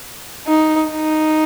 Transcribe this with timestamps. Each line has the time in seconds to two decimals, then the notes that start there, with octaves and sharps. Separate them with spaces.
0.47 D#4
0.91 D#4